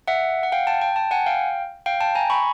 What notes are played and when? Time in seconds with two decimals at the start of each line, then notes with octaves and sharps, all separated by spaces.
0.08 E5 F#5
0.43 F#5
0.52 F5 G5
0.67 G5 A5
0.82 G5 A5
0.96 G5 A5
1.11 F#5 G#5
1.26 F5 G5
1.86 F5 G5
2.01 G5 A5
2.15 G#5 A#5
2.30 B5 C#6